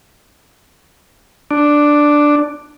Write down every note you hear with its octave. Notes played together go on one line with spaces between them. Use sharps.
D4